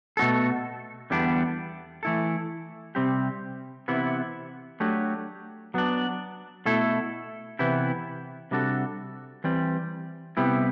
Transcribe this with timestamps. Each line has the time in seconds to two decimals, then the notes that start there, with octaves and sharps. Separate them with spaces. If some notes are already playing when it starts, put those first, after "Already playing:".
0.17 B2 A3 C4 F#4 A4
1.10 E2 D3 G3 B3 D4
2.03 E3 A3 E4 A4
2.95 C3 G3 C4 G4
3.88 C3 E3 B3 E4
4.80 F#3 A3 D4 G4
5.74 F#3 B3 D4
6.66 B2 A3 E4 A4
7.59 C3 E3 B3 E4 G4
8.51 C3 G3 D4 F#4 A4
9.44 E3 G3 C4
10.37 C3 G3 B3 E4 G4